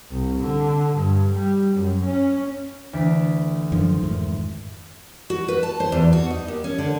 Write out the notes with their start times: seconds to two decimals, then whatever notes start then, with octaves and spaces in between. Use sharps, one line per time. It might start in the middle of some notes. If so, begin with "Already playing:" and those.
0.11 C2
0.41 D3
0.96 G2
1.35 G3
1.75 F#2
2.06 C#4
2.93 D2 E3 B6
3.72 F#2 D3 D#3 F3
4.02 F2 G#2 D#3
5.30 F#4
5.48 B4
5.63 A5
5.80 C5
5.92 E2
6.13 F#4
6.30 D#4
6.48 D#2
6.64 C#4
6.78 D3